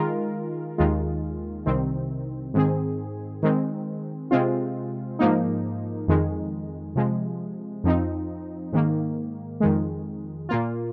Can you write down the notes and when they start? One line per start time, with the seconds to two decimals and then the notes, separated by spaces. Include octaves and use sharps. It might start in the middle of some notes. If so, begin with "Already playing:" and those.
Already playing: D#3 G#3 F4 A#4
0.78 D#2 D#3 G#3 F4
1.66 C2 C3 D#3 C4
2.54 G#2 D#3 C4 G#4
3.43 D#3 G#3 C4
4.31 C3 G#3 C4 F4
5.19 G#2 F3 A#3 D#4
6.08 F2 D#3 G#3
6.96 C3 F3 G#3
7.84 F2 F3 C4 D#4
8.73 G#2 D#3 A#3
9.60 F2 D#3 G#3
10.49 A#2 A#3 F4